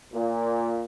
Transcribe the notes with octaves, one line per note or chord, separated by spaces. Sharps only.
A#2